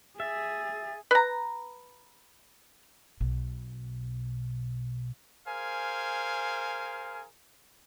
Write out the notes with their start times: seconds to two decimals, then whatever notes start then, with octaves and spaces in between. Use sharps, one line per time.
0.20 G#4 E5 A6
1.11 B4 A#5
3.20 B1 B2
5.46 G#4 A#4 C5 F5 G#5